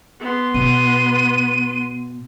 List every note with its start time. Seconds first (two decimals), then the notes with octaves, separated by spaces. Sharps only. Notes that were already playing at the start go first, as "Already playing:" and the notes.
0.20 B3 C6
0.54 B2 D#7